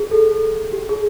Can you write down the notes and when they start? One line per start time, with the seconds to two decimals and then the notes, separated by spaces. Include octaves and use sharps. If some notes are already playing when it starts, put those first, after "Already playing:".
Already playing: G#4
0.11 A4
0.31 A4
0.73 G4
0.89 G#4